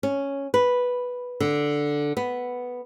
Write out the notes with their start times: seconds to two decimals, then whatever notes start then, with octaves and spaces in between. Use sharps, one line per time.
0.03 C#4
0.54 B4
1.40 D3
2.17 B3